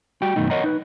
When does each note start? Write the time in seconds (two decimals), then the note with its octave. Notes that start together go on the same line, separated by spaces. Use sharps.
0.22 G3 F#4 G5
0.36 F#2 B2 D#3 A3 D#4
0.50 A#4 C#5 D#5 F#5 A#5
0.64 D#4 B4